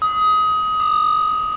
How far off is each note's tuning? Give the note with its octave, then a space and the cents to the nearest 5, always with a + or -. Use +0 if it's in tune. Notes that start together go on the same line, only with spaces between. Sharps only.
D#6 +20
D#6 -45